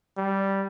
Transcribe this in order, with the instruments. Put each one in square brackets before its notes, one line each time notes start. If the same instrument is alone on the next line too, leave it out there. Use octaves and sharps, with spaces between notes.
[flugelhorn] G3